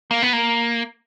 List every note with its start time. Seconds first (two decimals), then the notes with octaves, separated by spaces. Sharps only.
0.11 A#3
0.22 B3
0.33 A#3